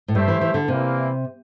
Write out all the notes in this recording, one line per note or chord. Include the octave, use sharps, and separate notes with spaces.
A2
G2 A3 E4 G4 C5 E5
E3
E3
D3
C3 E3 G3 A#3 E4